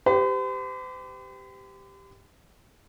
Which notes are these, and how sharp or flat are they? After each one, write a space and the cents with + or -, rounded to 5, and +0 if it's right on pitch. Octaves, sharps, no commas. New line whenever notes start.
G4 +0 C5 -45